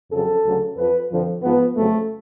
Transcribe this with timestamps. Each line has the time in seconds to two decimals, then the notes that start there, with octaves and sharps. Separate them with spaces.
0.12 F2 C#3 F#3 A4
0.44 D2 C#3 F#3
0.77 F2 F3 B4
1.10 F2 D3 F3
1.43 G#2 F3 B3
1.76 F2 C#3 F#3 A3